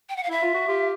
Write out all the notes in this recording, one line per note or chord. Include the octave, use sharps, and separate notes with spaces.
G5
F#5
F5
E4 E5
F4
F#4
F4 G4